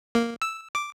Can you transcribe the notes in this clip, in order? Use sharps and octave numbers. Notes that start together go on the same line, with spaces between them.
A#3
E6
D6